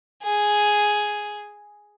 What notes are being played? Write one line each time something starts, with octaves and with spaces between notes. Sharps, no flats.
G#4